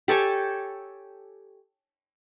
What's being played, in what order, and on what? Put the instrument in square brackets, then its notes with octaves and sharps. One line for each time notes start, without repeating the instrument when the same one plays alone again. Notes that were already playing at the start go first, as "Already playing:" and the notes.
[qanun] G4 A4 C#5 G#5